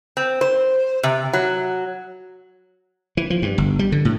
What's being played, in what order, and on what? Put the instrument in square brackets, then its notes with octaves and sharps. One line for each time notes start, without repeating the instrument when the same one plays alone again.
[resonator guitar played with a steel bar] C4
C5
C3
F#3
[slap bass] E3
F3
G2
G1
G3
D3
A2